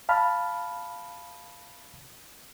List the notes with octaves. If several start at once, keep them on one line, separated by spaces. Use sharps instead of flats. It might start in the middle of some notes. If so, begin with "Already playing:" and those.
F5 A5 B5 F6